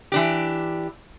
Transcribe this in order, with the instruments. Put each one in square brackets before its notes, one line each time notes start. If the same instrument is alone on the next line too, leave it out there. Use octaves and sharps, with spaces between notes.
[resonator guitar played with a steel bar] E3 D4 G4